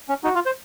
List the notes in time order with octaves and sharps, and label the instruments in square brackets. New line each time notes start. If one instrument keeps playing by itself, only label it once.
[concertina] C#4
[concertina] D#4 [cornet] F#4
[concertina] F4
C5